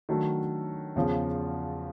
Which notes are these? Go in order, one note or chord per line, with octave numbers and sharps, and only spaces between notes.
D#3 F#3 A3 D4 F#4
E2 C#3 F3